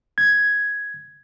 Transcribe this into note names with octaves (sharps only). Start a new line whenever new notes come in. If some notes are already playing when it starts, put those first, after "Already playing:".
G#6